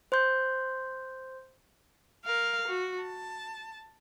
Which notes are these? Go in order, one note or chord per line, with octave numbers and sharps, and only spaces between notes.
C5 C6 G6
A#4 F5
F#4
A5